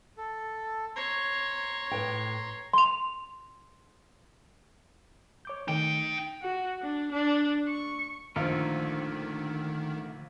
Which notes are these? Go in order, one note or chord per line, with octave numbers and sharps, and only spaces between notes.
A4
C#5 A#5 C6
A2 B4 G5
C6 F7
C#5 D6 G6
D#3 A3 D#4 G5
F#4
D4
D4
C#6
A#1 D3 D#3 A3 F4 A#4 C5